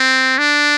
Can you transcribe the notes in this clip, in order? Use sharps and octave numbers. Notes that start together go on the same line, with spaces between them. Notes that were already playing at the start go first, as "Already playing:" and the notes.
Already playing: C4
D4